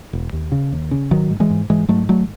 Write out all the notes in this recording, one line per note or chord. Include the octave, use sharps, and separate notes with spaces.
E1
D#2
C#3
D#2
C#3
G#1 D#3 F#3
G#2
E3 G#3
G#2
G#2 E3 G#3
G#2 F#3 A3
G#1 F#3 A3